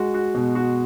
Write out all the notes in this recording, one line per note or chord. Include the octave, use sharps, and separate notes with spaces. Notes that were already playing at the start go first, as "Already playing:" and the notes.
Already playing: G#3 F#4
F#4
B2
F#4